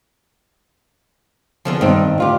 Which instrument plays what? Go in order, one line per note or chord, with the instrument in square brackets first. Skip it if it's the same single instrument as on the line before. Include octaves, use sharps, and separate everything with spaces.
[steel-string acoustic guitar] E2 D3 F3
[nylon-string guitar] G2 C4 [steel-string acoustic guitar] D#3
[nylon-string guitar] D2 F4 G4